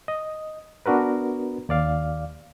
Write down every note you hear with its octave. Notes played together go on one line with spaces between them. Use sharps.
D#5
B3 D4 F#4 A#4 B4
D#2 D5 F5